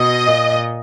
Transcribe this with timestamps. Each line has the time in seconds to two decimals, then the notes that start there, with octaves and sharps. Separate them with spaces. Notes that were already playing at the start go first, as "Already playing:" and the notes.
Already playing: B2 D#5
0.27 A#2